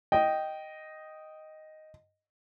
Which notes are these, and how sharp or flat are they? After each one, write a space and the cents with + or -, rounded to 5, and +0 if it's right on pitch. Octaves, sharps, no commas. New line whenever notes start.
D#5 +0 G5 -10